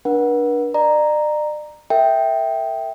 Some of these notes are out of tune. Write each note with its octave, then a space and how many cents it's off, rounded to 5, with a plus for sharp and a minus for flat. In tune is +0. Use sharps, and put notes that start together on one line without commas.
D4 +0 B4 -45 F#5 +0
D5 +40 A#5 +0
A#4 -45 E5 -5 G5 +0